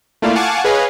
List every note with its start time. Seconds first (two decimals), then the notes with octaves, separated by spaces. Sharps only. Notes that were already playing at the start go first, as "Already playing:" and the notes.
0.22 A3 A#3 E4 F4 D5 F5
0.35 F5 F#5 G#5 A5 C#6 D6
0.64 G#4 B4 C#5 D#5 F5 G#5